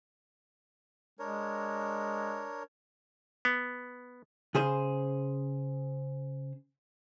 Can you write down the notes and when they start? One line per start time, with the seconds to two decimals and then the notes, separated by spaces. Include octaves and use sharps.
1.19 G#3 D4 A#4 C#5
3.45 B3
4.55 C#3 G#4 C5